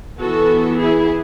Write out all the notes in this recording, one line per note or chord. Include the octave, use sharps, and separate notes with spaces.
E3 B3 F#4 A4
E4 G#4